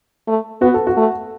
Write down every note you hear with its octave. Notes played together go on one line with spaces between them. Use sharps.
A3
B3 F#4
A4
F#4
A3